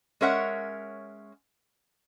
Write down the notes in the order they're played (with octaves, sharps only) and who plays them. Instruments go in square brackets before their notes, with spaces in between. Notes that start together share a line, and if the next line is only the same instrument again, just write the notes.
[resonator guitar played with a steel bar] G#3 C#4 A#4 C#5 E5 F#5